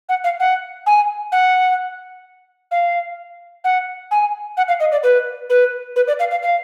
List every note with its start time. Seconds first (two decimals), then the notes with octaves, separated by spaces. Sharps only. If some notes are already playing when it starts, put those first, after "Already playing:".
0.09 F#5
0.24 F5
0.40 F#5
0.86 G#5
1.32 F#5
2.71 F5
3.64 F#5
4.11 G#5
4.57 F#5
4.68 F5
4.80 D#5
4.92 D5
5.03 B4
5.50 B4
5.96 B4
6.08 D5
6.19 F5
6.31 F5
6.42 F5